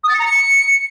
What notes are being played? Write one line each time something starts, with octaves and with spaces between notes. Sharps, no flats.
D#6
A6
C#7
A#5
C#7